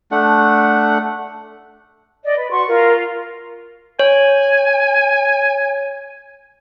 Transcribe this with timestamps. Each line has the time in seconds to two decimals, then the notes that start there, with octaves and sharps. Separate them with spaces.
0.11 A3 D4 F#5
2.23 D5 D#5
2.38 B4
2.51 F#4 C6 C#6
2.68 F4 A#4
3.99 C#5 G#5